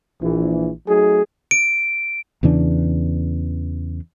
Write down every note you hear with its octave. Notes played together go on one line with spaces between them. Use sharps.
A#1 E3
F#3 A3 D#4 G#4
D7
E2 C#3 E3 D4